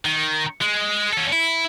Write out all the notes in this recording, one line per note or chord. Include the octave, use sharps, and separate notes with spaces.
D#3
G#3
C#4 A4
E4